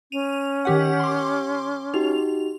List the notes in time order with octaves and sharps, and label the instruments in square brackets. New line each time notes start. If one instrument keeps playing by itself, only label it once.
[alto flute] C#4 [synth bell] D#7 F7
[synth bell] D#3 G4 F#5
C6 D6
[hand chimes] D#4 F#4 G4 [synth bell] F7